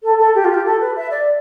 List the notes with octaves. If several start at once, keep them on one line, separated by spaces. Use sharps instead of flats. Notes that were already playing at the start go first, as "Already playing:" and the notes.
A4
A4
G4
F4
G4
A4
B4
E5
D5